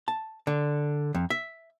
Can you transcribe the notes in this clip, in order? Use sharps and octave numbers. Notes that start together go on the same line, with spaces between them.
A5
D3
F2
E5